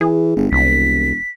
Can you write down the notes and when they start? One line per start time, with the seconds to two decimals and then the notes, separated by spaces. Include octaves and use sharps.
0.01 E3 G#4
0.36 G1
0.52 E1 C2 B6